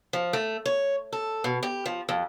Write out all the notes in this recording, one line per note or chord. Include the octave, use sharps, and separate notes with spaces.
F3
A3
C#5
A4
B2
G4
F3
F2